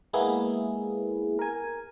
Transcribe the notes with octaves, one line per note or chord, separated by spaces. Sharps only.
G#3 A#3 B3 E4 G#4
A#4 G#5